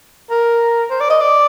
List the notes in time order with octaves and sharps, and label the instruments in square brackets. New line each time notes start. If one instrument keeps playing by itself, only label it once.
[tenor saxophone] A#4
C5
D5
D#5
D5